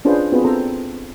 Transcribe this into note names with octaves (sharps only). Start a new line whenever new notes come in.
C#4 D4 F4 G#4 B4 C5
B3 C4 F4 F#4 G#4 B4
C4 A4 C5 A#5